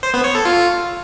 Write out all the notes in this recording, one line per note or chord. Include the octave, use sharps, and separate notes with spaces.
C5
B3
C#5
A4
F4